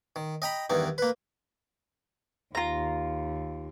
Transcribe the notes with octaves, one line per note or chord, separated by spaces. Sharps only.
D#3
D#5 G5 A#5 B5
E2 G2 D#3 D#4
A#3 B4
D#2 F4 A#5